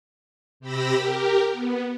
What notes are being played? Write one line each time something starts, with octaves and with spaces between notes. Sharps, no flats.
C3 G4 B5 E6 A#6
G4 A#4
B3